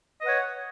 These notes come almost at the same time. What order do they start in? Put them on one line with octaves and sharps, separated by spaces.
D#5 B4 F#5 C#5